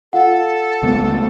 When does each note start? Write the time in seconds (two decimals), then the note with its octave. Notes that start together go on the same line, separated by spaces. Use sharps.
0.13 F4 A4 F5 F#5
0.83 C#2 A3 B3